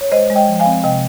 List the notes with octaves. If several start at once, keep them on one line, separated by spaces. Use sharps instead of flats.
C#5
G#3 C5 D#5
G#3
D#5 G5
F3
F5 G#5
C4
C3 D#5 G5